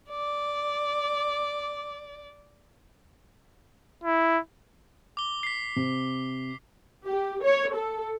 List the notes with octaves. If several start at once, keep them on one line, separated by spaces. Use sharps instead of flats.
D5 D6
E4
D6 G7
B6 C7
C3
G4
C#5
A4